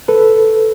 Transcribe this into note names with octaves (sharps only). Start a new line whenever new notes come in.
A4 B4